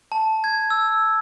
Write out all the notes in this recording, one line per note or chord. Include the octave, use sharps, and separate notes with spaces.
A5
G#6
E6